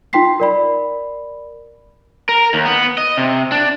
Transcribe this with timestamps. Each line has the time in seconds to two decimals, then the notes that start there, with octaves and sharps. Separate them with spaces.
0.13 D#4 F4 G5 C6 B6 C7
0.40 A#4 D5 B5
2.29 A#4
2.54 D#2
2.65 B3
2.98 D#5
3.18 C3
3.52 D4